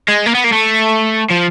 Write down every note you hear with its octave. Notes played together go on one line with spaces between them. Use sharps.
G#3
A#3
B3
A#3
A3
F3